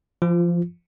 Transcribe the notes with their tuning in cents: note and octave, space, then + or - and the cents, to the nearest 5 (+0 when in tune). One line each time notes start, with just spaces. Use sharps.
F3 -20 F4 +0